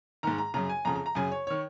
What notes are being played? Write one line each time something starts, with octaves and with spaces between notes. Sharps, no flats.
G#2 D#3 A#5
A#5
F#2 C#3 A#5
G#5
F2 C#3 A#5
A#5
A#5
F#2 C#3 G#5
C#5
D#3 C#5